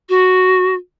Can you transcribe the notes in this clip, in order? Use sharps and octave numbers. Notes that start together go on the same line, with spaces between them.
F#4